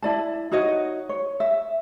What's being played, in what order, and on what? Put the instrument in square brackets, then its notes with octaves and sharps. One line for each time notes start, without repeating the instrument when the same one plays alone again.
[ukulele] E4 D5 A5
D#4 F#4 C#5 D#5
C#5
E5